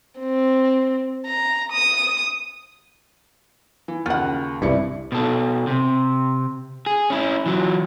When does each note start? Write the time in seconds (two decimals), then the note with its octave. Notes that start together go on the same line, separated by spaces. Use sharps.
0.20 C4
1.27 A#5
1.72 D#6
3.88 E3
4.06 D#2 C#3 F4 F#5
4.62 C2 G2 E4 D5 C#7
5.12 B2 A4
5.67 C3
6.86 G#4
7.10 C#4 E4
7.46 E3 F#3